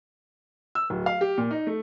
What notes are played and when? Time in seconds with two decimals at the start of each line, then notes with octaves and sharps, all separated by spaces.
0.75 E6
0.90 D1
1.06 F5
1.21 G4
1.38 A#2
1.51 D#4
1.67 A3